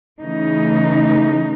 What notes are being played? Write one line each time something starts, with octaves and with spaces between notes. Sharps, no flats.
C#3 E3 A3 D#4